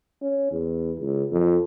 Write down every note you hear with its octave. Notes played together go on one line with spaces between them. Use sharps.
C#4
E2
C#2
F2